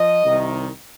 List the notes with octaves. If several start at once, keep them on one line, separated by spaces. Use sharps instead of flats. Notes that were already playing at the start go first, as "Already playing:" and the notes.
Already playing: F3 D#5
C2 C3 D#3